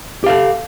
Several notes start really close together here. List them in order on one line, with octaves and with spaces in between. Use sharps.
G4 F5 A4